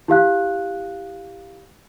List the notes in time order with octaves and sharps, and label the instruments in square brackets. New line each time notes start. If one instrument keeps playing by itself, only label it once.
[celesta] E4 G4 F5 F#6